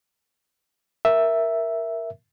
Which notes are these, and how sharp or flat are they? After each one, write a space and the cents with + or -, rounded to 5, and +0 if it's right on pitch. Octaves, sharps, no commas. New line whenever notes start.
A#4 +0 E5 +0